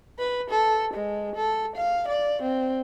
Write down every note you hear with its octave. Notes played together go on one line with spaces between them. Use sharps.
B4
A4
G#3
A4
F5
D5
C4